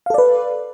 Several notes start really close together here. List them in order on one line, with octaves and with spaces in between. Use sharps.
F5 A4 D5 B4